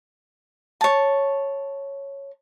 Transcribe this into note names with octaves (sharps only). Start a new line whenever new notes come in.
C#5 A5